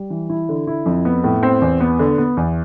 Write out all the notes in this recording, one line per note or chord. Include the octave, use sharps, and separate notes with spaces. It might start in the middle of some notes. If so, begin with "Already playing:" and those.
Already playing: G3
E3
E4
D3
E4
F2
B3
A2
C4
E2
B3
D3
B3
E2